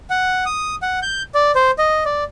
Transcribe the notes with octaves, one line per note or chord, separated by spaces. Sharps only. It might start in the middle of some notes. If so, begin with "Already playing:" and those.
F#5
D#6
F#5
G6
D5
C5
D#5
D5